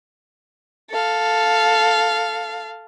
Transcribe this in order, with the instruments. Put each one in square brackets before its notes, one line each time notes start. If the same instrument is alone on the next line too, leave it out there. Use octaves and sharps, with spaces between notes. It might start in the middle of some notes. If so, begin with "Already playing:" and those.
[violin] A4 F5